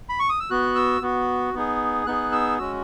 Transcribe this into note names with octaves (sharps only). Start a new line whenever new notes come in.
B5
C#6
D#6
E6
B3 F#4 F#6
E6
B3 F#4
B3 D#4 G#4
B3 D#4 G#4 F#6
E6
G#3 C#4 F#4 E6